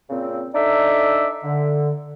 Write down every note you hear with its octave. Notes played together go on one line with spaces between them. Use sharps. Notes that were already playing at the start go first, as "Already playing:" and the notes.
A#2 C#3 C4
D4 D#4 A4 D5 E5
D3